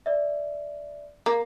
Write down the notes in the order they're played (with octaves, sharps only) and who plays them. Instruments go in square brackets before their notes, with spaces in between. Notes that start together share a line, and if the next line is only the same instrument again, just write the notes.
[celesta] D5 E5
[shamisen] A#3